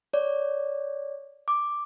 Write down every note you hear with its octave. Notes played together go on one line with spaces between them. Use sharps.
C#5 D5
D6